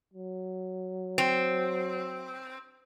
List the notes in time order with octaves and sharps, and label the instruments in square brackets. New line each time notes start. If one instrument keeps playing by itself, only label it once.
[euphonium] F#3
[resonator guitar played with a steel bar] C4